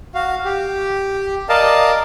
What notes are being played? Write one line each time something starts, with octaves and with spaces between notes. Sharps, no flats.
F#4 F5
G4
A#4 D5 D#5 F5 A5